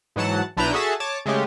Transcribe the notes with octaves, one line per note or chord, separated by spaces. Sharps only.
G#2 E3 F#3 F#5 A5
B1 D4 E4 B4 A#5 G6
F#4 G#4 A4 E5 A5
C#5 A5 D6
C#3 G#3 A3 C#4 G4